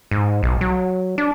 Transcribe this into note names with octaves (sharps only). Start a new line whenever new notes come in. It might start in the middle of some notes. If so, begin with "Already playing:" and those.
G#2
B1
F#3
D4